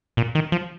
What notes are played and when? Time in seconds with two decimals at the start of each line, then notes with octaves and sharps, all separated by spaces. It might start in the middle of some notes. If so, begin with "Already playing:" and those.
0.17 A#2
0.35 D#3
0.52 F3